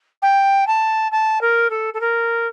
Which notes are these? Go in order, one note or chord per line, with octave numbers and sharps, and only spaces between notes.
G5
A5
A5
A#4
A4
A4
A#4